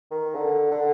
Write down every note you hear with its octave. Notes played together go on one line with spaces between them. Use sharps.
D#3
D3
D3